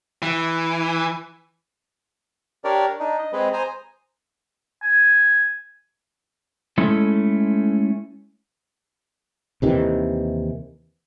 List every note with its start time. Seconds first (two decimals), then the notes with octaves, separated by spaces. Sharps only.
0.22 E3
2.64 D4 G4 A#4 C#5 D5
3.00 D4 D#4
3.19 D#5
3.33 G#3 C4 B4 D#5
3.53 C5 G#5 A#5 D#6
4.82 G#5
6.78 G#3 A3 C#4 E4 A4
9.62 D#2 C3 D#3 E3